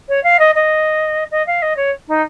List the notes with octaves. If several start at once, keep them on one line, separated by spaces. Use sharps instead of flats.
C#5
F5
D#5
D#5
D#5
F5
D#5
C#5
D#4